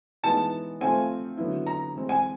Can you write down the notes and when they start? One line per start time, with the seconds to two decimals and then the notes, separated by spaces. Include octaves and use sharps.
0.23 E3 G#3 B3 D#4 A5
0.80 F3 A3 C4 F4 G#5
1.37 D3 F#3 B3 E4
1.67 A#5
1.94 E3 G#3 C4
2.09 G#5